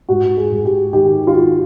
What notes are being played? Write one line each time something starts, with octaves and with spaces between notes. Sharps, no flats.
G#2 F#4
G#4
G#2
G4
D#3 G4
F4
D#3 F#4